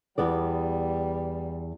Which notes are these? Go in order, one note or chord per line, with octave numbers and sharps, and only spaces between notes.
E2 G3 B3 D5